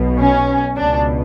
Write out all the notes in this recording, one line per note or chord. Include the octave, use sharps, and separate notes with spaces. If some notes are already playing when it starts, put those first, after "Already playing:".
Already playing: B1 B2
C#4
C#2 B2 D4